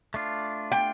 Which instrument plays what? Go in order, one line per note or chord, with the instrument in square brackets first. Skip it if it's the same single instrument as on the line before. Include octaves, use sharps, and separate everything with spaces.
[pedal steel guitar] A3 D4 F4
[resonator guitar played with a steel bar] G5